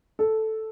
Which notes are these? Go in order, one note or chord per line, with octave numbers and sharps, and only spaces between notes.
A4